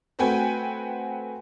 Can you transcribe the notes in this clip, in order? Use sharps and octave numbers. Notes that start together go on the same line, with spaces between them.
A3 C4 F#4 B4 G5 G#5